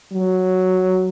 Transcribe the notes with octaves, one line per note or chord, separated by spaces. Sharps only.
F#3